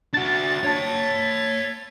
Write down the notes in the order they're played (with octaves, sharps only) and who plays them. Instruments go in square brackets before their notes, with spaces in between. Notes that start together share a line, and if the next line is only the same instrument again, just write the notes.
[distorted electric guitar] D4 F#4 [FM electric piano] A6
[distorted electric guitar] C#5 A5